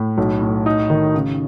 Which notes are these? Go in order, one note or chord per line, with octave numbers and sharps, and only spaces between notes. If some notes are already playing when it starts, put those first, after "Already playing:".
Already playing: A2
B1
A2
D#4
D#3
C#3